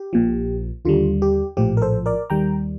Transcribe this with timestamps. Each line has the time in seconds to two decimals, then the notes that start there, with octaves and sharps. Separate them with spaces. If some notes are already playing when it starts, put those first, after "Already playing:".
Already playing: G4
0.13 A#1 A#2 F3
0.85 D#2 D3 G3 F4
1.22 G4
1.57 A#1 A2 F3 G4
1.77 A#4
1.82 A4 C5
2.06 A#4 D5
2.30 D#2 D#3 G3 G5 A#5